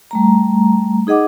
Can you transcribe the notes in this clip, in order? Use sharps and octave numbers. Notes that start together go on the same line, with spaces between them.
G3 A3 A#5
D#4 G#4 D#5 F#5 D6